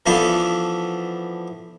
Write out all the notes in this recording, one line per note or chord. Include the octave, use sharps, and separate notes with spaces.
E3 F3 A3 B3 D4 A4